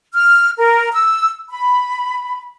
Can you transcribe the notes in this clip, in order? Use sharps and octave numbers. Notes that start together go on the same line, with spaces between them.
F6
A#4
E6
B5